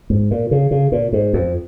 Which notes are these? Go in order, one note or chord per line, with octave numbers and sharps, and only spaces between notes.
G#2
A#2
C#3
C#3
A#2
G#2
F2